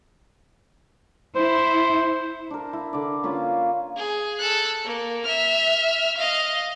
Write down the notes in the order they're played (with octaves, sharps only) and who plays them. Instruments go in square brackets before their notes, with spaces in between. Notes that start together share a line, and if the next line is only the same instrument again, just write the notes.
[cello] E4 [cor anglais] C5
[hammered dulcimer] D4 A#4
E4
D3 D5
A#3 C#4 F4 B4
[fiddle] G#4
A4 F#6
A#3
E5 F6
D#5 F5